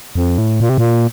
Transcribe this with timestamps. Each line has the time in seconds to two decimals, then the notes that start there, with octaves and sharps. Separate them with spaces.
0.15 F2
0.38 A2
0.60 A#2
0.69 C3
0.78 A#2